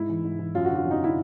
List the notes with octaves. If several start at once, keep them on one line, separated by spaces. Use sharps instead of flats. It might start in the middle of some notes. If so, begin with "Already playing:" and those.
Already playing: G#2 E4
E3
G#2
E3
F#2 F4
F#4
D3
F4
F#2
D#4
D3 E4